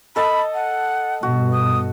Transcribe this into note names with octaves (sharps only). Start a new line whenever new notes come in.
A4 D#5 A5 B5
F#5
G2 B2 F#4
D#6